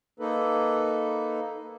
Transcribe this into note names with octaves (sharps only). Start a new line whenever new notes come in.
A#3 D#4 A4 B4